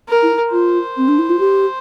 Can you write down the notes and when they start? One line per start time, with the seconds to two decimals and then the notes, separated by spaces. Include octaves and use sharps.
0.08 A#4
0.23 E4
0.52 F4 C5
0.97 C4
1.08 D4
1.19 E4
1.29 F4
1.39 G4